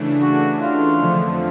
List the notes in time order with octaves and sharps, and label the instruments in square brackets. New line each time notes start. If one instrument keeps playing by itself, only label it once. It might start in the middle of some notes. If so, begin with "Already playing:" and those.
Already playing: [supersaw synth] C#3 E3 A3 D4
[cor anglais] F#4
F4
[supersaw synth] F2 D3 F3 A3